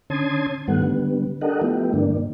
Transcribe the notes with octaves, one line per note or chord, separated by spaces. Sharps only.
D3 C#4 A5 C6 D#6 G#6
G2 D#3 G3 A3 B3 F#5
D3 G3 B3
D4 G4 A4 A#4 D#5 F#5
F3 A3 B3 E4 G4
G2 D3 A#3 D4